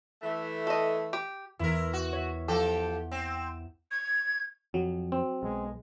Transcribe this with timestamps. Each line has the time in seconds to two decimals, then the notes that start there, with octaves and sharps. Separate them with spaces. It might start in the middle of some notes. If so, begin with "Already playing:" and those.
0.22 E3 A3
0.67 A4 D#5
1.13 G4
1.59 E2 E4 A#4
1.93 F#4
2.13 C#5 E5
2.48 F3 G4 A4 F#5 D6
3.12 C4
3.91 G#6
4.74 F2 F#3
5.12 C4
5.43 B1 G#3